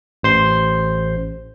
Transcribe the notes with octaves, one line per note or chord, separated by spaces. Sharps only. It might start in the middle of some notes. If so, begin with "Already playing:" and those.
A1 C5 C6